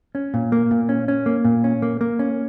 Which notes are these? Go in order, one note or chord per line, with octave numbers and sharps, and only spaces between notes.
C#4
A#2
A#3
A#2
C#4
C#4
A#3
A#2
C#4
A#3
A#3
C#4